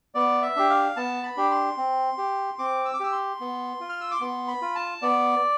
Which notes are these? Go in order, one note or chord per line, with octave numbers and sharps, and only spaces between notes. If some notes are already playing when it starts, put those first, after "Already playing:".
B3 D5
E5
D4 G4
F5
B3 A5
B5
D4 G4
C6
C4
G4
C4 D6
E6
D6
G4 E6
C6
B3
F4
F6
E6
D6
B3 C6
B5
F4
A5
B3 D5